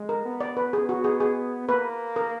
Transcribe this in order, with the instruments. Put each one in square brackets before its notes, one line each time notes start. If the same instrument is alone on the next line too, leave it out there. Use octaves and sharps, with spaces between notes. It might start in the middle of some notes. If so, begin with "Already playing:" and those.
Already playing: [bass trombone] G#3
[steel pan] A#4
[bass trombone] B3
[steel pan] D5
B4
[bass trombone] B3 [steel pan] G#4
[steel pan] F#4
G#4
G#4
[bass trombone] A#3 [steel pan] B4
[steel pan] A#4